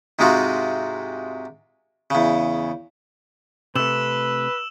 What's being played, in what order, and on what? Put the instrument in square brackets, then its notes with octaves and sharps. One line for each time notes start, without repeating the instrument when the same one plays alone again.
[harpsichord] G#2 C3 G#3 D#4 F4 F#4
E2 C#3
[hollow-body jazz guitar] C3 A3 [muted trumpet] B4 [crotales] E6 E7 F#7